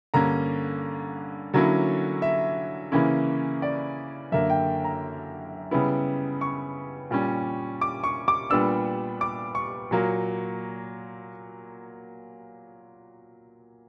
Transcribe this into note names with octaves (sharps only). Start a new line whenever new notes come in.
G2 D3 A#3 C#4 A#5
D3 F#3 A#3 C#4 E4
E5
C#3 E3 A#3 C#4 E4
D5
F#2 D3 A#3 E5
G5
A#5
C#3 G3 B3 E4
C#6
A#2 G3 C#4
D6
C#6
D6
A#2 G3 B3 D4 E6
D6
C#6
A#2 F#3 A#3